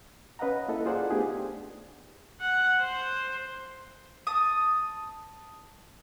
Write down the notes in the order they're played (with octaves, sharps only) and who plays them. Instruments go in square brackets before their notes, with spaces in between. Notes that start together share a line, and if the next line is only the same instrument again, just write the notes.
[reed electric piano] C#4 B4 D#5 F5 F#5 A#5
A#3 E4 A4 D#5
F4 G#4 C5 D5 F5 F#5
A3 B3 D4 D#4 G4 G#4
[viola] F#5
C5
[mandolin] A5 D#6